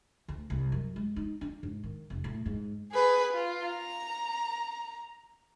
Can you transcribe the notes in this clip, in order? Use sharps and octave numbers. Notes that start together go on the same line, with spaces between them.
D2
C2
F#2
G#3
D#4
D4
G#2
D#3
F1
A2
G#2
G#4 B4
F4
A#5